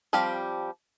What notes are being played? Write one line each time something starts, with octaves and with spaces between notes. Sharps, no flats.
F3 G3 C4 G4 F5